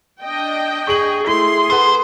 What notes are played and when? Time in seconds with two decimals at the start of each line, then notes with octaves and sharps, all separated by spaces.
0.22 D4 D#5 G5
0.87 G#4 C#6 F#7
1.27 A3 E4 G#4 C6
1.70 A4 B4 C5 F#5